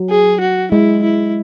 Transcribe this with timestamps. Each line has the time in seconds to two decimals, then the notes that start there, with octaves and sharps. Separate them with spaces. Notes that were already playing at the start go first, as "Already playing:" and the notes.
Already playing: F#3
0.10 G#4
0.41 F#4
0.72 G#3 E4
1.03 E4